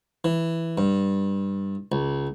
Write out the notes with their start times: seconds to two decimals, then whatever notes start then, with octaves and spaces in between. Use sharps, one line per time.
0.24 E3
0.78 G2
1.92 C#2